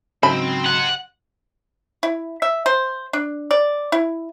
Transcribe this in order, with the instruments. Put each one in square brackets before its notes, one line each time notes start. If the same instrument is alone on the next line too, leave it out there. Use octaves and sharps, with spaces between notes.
[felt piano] G#2 C#3 F#3 [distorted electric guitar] C4 [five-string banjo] B5
[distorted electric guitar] G4 C6 [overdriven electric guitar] F#5
[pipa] E4
E5
C5
D4
D5
E4